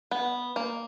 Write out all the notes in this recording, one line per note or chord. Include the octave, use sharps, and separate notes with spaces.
B3
A#3